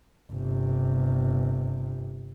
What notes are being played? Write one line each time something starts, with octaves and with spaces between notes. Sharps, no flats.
G1 C3